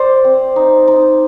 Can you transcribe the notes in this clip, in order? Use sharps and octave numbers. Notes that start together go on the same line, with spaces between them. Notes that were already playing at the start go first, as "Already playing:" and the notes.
Already playing: C5 D5
C4
D#4
D#4